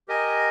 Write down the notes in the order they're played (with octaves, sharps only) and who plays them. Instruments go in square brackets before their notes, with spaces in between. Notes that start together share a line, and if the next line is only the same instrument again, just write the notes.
[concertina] G4 A#4 D#5 G#5